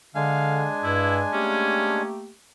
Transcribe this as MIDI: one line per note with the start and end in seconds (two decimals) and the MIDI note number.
0.15 0.66 50
0.15 2.02 56
0.15 2.02 62
0.15 0.67 77
0.15 2.02 80
0.84 1.21 43
0.84 1.17 64
1.33 2.31 57
1.33 2.31 58
1.33 2.07 61
1.33 2.31 67